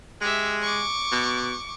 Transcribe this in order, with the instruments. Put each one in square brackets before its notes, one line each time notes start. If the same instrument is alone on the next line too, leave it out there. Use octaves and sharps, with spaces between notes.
[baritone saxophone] G#3 [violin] G4 E5
[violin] C#6 D6
[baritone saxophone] B2